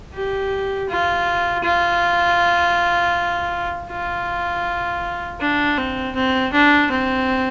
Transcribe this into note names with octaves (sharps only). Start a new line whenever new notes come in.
G4
F4
F4
F4
D4
C4
C4
D4
C4